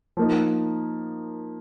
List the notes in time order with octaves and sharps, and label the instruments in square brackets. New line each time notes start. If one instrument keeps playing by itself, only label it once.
[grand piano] F3 A#3 D#4